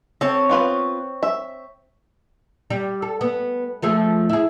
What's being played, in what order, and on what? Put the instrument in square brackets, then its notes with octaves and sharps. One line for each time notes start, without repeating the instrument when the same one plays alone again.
[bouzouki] C4 C#5 [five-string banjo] A4
[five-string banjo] B3 F4 B4
E5
[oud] G3
A4
B3
F3 A3 G#4
E4 G#4